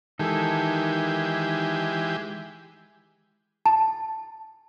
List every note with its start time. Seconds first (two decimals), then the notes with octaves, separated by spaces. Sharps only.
0.19 D#3 E3 G#3 G4 A4
3.66 A5